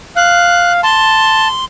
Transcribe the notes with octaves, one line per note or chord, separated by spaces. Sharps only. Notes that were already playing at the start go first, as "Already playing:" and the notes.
F5 F#6
A5 C6